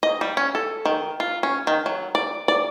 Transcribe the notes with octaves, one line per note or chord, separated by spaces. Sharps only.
D#5
G3
C#4
A4
D#3
F4
C#4
D#3
F#3
D5
D5